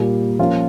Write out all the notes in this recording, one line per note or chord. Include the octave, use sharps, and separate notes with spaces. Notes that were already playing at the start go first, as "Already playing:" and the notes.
Already playing: A#2 G3 A#3
F3 A#3 C#4 F4